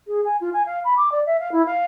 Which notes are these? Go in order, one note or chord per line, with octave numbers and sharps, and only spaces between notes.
G#4
G#5
F4
G#5
F5
B5
D6
D5
E5
F5
E4
F5